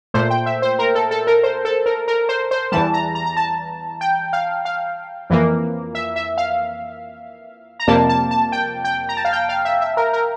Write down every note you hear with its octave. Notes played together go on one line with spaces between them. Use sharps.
A#2 A3 C5
G5
E5
C5
A#4
A4
A4
A#4
C5
A4
A#4
A#4
C5
C5
E2 E3 G3 A5
A#5
A#5
A#5
A5
G5
F5
F5
F2 E3 A#3
E5
E5
F5
A#5
F2 C3 G3 A#3 A5
A5
A5
G5
G5
A#5
A5
F5
G5
F5
E5
E5
A#4
A#4